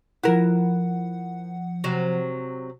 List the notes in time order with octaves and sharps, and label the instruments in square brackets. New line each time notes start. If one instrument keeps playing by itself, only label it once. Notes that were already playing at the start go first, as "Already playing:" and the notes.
[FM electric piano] F3 F#5 [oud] E4 A#4
[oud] C3 F#3